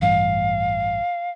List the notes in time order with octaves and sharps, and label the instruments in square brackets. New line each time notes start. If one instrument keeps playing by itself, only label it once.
[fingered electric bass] A1 G2 E3 [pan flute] F5